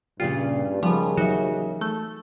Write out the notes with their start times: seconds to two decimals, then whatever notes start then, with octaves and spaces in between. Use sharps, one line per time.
0.20 G2 A#2 C#3 F4 G4
0.83 D#2 C#3 F3 G3 B3
1.17 E3 F#3 D#4 F#4 E5
1.81 A3